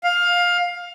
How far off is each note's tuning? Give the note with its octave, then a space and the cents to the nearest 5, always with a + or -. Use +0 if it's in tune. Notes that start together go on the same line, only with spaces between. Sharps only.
F5 +15